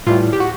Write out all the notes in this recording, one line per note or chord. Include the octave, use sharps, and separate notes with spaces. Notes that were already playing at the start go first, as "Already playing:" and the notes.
A2 E3 G3 F4
G4
F#4